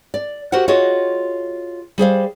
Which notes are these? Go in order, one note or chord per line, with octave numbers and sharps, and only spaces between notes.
D5
F#4 G4 A#4 C5 F#5
F4 F#4 G#4 C#5 D#5 F#5
G3 G#4 C5 F5